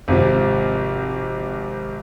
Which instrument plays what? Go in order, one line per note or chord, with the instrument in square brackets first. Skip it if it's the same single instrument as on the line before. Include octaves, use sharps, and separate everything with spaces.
[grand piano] G#1 C3 F3